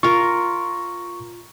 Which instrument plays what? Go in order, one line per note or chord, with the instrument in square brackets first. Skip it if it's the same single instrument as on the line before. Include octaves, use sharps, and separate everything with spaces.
[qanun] F4 A#4 [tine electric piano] C#6